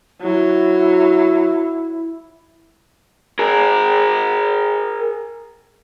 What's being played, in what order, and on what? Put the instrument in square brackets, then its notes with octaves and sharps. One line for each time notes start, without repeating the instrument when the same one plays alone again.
[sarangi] F#3 [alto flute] E4
[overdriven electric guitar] G#4 A#4